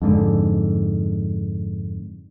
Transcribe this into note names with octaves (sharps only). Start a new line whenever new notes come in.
F2 G#2 D3